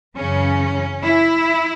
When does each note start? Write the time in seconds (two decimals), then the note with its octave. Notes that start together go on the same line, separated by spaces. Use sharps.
0.17 F#2 C#3 E3 C#4
1.03 E4